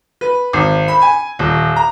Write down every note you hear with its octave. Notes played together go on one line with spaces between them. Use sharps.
B4
G#1
B5
G#5
D#1
A#5